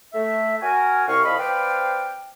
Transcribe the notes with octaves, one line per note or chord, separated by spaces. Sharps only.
A3 E5
F#4 A#4 G#5
C2 F5 C#6
C2 F3 D#5 F5 B5
C4 B4 C5 D5 F5 G5